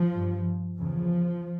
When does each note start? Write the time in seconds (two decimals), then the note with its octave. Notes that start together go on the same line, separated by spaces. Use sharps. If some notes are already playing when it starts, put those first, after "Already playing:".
Already playing: F3
0.13 G2
0.77 E2 C#3 F3